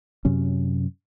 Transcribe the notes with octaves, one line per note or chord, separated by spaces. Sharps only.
F#2 C3 F#3 C#4